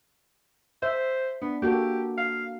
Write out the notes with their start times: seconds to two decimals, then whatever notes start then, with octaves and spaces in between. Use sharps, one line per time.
0.82 C5 E5
1.42 B3 D4
1.62 A#3 F#4 G4 A4
2.18 F5